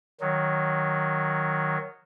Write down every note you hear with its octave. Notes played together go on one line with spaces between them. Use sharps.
D#3 F#3